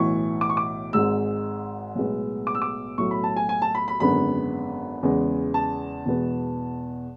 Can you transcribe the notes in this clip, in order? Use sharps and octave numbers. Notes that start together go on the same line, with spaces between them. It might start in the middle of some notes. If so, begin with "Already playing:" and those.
Already playing: B1 A2 E3 C#6
D6
C#6
D6
G#1 G#2 G#3 E6
B1 A2 G#3 B3
D6
E6
D6
B1 A2 F#3 A3 C#6
B5
A5
G#5
G#5
A5
B5
B5
G#1 F#2 D3 G#3 B3 B5
E2 C#3 G#3 B3
A5
E2 B2 G#3 B3